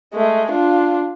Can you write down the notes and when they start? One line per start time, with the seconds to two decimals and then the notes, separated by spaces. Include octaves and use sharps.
0.14 G#3 A3
0.51 D4 F4